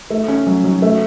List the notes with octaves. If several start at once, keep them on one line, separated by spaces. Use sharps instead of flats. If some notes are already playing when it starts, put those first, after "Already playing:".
A3
C#4
F#3
F#3
A3